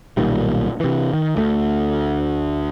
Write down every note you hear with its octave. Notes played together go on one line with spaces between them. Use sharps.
B1 A#2 D#3 G3
C3 E3
D#3
D2 A3